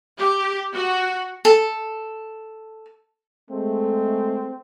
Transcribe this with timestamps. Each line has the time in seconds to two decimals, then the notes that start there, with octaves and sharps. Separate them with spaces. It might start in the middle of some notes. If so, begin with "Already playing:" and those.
0.19 G4
0.74 F#4
1.45 A4
3.51 G#3 A3 C4